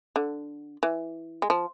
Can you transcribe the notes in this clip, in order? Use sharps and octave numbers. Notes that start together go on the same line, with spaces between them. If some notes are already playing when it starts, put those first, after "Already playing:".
D3
E3
G#3
F3